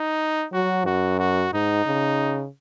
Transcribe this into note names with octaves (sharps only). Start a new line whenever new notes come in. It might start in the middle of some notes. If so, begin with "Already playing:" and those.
Already playing: D#4
F#3 F#4
F#2 F#4
F#4
G#2 D#4
C#3